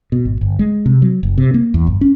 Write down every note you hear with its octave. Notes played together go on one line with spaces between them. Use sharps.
B2
G#1
G1
G#3
C3
F#3
F#1
C3
A#3
E2
G1
C#4